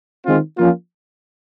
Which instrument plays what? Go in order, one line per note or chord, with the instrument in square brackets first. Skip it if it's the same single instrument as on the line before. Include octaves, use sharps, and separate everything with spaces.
[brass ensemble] D#3 G#3 C4 F4
F3 A#3 C#4 F4